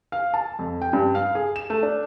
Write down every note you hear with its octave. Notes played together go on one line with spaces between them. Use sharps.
F5
A5
F2
G5
G2
F5
G#4
E7
A3
D4